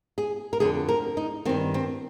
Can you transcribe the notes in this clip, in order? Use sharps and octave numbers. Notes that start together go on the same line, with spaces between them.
G#4
A#4
F2 D3 G#4
A#4
D#4
G2 D#3 C4
C4